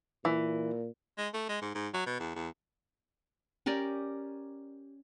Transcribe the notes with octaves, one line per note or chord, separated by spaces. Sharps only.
A#2 E3
G#3
A3
G#3
G#2
G#2
F#3
B2
E2
E2
C#4 G4 A#4 D5